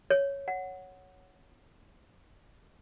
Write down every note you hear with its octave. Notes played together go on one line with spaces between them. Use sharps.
C#5
F#5